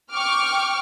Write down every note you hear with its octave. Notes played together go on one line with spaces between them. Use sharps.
G5 C#6 D6 F6